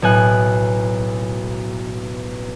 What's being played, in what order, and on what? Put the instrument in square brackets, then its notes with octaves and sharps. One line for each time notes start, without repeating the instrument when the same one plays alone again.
[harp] B1 A2 G#5 F#6